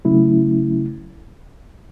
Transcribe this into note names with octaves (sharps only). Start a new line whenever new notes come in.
C#3 F#3 A3 C#4 E4